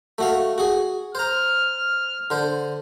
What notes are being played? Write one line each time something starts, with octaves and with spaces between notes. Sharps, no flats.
A3 F#4 F5
F#4 G#4
C5 A#5 F6
D3 C5